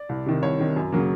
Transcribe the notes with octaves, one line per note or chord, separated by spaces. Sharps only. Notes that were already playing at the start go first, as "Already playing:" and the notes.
Already playing: D5
C2
C3 D#3
C2 C#5
C3 D#3
F#2
C#3 F#3 A#3